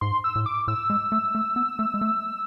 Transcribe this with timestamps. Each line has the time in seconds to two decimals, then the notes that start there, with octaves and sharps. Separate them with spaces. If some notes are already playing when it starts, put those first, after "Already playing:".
0.01 G#2 C6
0.24 E6
0.36 A2
0.46 D6
0.68 A2 E6
0.90 G#3
1.12 A3
1.35 A3
1.56 B3
1.79 A3
1.94 G#3
2.01 A3